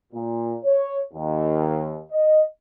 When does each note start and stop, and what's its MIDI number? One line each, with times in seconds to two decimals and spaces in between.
0.13 0.56 46
0.64 1.00 73
1.14 1.99 39
2.11 2.41 75